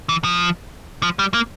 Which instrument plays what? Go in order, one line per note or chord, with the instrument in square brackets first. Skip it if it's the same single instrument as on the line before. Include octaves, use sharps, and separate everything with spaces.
[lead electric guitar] E3
F3
F3
G3
A#3